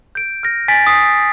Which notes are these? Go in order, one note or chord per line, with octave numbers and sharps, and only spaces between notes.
G6 D7
F6 A#6
G#5 A6 B6 D7
D#6 B6 C7